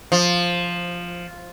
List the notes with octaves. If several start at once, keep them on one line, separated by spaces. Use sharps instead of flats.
F3